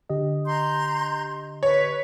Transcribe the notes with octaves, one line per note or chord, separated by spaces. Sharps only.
D3 G4 D#5
A#5 C6 G6
B4 C#5